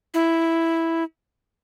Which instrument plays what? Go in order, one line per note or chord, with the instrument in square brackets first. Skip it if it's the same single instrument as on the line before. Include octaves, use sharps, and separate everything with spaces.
[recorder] E4